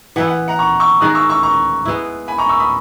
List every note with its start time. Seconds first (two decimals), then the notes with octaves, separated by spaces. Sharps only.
0.16 E3 B3 E4 F#5
0.27 F#5
0.48 F#5 A#5
0.59 A#5 C#6
0.80 C#6 E6
1.00 D#3 G#3 D#4 A#4 D#6 F#6
1.15 C#6 E6
1.29 C#6 E6
1.43 A#5 C#6
1.85 G#3 B3 E4
2.28 G#5 B5
2.38 A#5 C#6
2.49 C#6 E6
2.59 B5 D#6